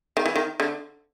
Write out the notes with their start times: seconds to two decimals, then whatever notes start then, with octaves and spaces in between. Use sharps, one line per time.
0.17 D#3
0.26 E3
0.36 D#3
0.60 D3